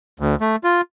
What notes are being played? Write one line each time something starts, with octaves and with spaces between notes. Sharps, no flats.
D2
A3
F4